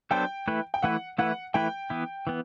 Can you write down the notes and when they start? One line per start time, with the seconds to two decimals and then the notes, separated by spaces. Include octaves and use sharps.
0.11 F#3 B3 D4 A4 C5 G5
0.48 E3 A3 E4 B4
0.74 G5
0.83 E3 A3 E4 B4 F#5
1.18 E3 A3 E4 B4 F#5
1.54 E3 A3 E4 B4 G5
1.90 E3 B3 E4
2.27 E3 B3